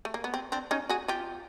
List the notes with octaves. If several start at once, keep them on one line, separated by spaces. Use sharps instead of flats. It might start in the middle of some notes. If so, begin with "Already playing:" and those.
A3
A#3
B3
C4
C4 D4
C#4 D#4
F#4 G#4
F4 G4